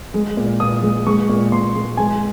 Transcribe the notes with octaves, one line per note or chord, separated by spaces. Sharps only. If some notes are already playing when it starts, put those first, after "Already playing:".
G#3
A#2
A#2 D#6
G#3
G#3 C#6
A#2
A#2 C6
G#3
G#3 G#5